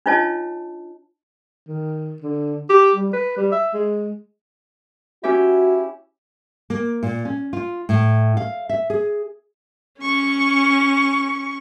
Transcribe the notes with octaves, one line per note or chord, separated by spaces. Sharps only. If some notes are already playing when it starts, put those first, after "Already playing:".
D4 D#4 F4 C#5 D#5 A5
D#3
D3
G4
G3
B4
G3
E5
G#3
C#4 E4 F#4 G4
A#3
A#2
C#4
F4
A2
F5
E5
G#4
C#4 C#6